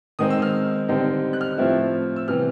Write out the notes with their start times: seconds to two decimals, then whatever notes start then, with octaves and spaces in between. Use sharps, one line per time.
0.19 D#3 G#3 C4 D#4 D#6
0.30 E6
0.42 F6
0.89 D3 G3 C4 D#4
1.33 F#6
1.41 F6
1.58 A2 F3 A3 C4 E4
2.16 E6
2.28 C3 E3 G3 B3 F6